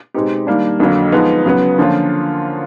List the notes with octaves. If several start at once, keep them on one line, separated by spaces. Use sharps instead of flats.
B2 G#3 C4 D#4 G4
D#3 G3 A#3 D4
F2 D3 F#3 A#3
F3 G#3 B3 D#4
C#3 F#3 B3
D3 F3 A#3 C#4 F4